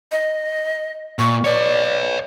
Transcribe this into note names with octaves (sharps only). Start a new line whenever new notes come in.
D#5
A#2 C#6
B4 C#5 D5